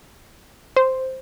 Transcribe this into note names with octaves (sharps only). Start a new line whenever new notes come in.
C5